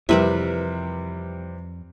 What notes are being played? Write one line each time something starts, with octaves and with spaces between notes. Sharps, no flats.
F2 C3 E3 G3 A#4 B4 E5